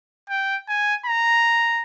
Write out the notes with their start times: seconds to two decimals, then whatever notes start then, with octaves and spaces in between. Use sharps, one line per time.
0.30 G5
0.68 G#5
1.06 A#5